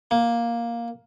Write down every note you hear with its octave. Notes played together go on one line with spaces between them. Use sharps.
A#3